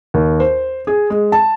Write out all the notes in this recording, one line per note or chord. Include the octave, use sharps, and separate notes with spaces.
D#2
C5
G#4
G#3
A5